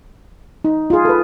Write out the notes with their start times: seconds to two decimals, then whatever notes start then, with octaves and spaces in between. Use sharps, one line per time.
0.65 D#4
0.90 F4 G#4
1.05 A4 B4